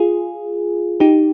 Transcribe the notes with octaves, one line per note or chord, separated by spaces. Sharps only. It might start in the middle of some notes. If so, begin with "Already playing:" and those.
Already playing: F4 G#4
D#4 G4